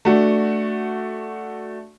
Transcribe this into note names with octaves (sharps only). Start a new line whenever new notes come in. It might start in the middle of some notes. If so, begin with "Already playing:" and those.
A3 D4 F#4